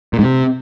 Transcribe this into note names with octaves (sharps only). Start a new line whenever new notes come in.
A#2
G#2
C3